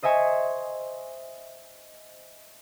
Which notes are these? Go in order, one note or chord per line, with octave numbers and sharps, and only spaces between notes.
C5 D#5 E5 G#5 C#6